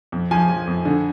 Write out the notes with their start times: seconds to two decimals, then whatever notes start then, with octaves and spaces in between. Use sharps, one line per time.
0.12 F2
0.31 F3 G#5
0.49 F3
0.67 F2
0.85 D3